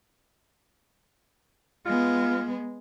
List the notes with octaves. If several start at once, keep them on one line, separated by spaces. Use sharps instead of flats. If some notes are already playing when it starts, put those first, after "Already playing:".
G#3 B3 F4